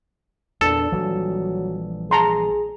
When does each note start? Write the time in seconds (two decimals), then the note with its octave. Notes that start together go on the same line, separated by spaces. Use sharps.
0.61 E2 A#2 D4 A4
0.92 A#1 E3 F#3 G3
2.11 G#4 A5 A#5 C6